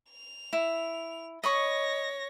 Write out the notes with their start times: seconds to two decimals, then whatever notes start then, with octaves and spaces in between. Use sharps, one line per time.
0.10 F7
0.53 E4
1.44 C#5 D#5 B5 C#6 A#6